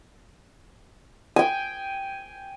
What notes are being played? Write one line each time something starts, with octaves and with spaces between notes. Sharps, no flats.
G5 G#5